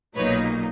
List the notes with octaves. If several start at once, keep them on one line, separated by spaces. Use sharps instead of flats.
B1 A#2 F#3 A#3 D#4 B4 C#5